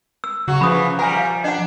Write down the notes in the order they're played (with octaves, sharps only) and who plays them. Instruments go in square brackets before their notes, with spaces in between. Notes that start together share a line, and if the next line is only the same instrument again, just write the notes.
[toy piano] E6
[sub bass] C#3 [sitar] F#3 F#4
[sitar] C#3 E3 [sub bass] F3 [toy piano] B5 D#6
[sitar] G3 A#4 [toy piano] F#5 G#5
[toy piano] F5
[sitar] D4 [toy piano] D#5 F#5